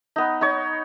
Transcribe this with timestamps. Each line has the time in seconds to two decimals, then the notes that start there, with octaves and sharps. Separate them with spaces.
0.16 B3 D#4
0.41 D#4 C#5